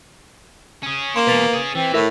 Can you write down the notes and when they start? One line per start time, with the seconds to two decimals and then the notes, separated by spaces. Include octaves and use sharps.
0.83 C#4 G#4
1.16 A#3 C6 E7
1.27 E2 B2 B4 A6 F7
1.53 C#4 G#4
1.75 E3 C4
1.94 A2 E4 A#4 E5